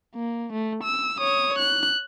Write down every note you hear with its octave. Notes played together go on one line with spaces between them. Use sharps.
A#3
A3
E6
C#5 D#6
F#6